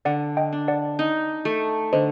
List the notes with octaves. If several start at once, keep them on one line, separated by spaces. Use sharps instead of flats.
D3 D5 F#5
D#5 G5
D4
D5 F#5
D#4
A3
D3 C5 D#5